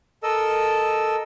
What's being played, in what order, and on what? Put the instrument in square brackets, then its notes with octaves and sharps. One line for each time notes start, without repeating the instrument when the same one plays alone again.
[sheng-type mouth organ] A4 A#4 D#5 E6